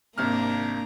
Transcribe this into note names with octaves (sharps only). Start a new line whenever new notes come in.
G#1 C3 A#3 D4 A#5 F6